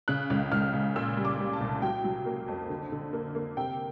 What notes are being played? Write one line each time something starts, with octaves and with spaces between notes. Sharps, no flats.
C#3 F#6
C#2
C#2 F6
C#3
A#2 E6
G3
D6
G3
A5
C2
F#3 G5
F#3
A#3
F2
D3
D3
A#3
A#3
C3 G5